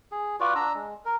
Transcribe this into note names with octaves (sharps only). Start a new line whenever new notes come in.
G#4
F4 F#4 B4 D5
D4 A#5 E6
G#3
A#4